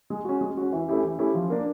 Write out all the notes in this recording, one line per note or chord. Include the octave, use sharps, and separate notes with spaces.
G#3
C#4 F#4
G#3
C#4 F#4
E3
A3 C#4 E4 G4
E3
A3 C#4 E4 G4
F3
A#3 D4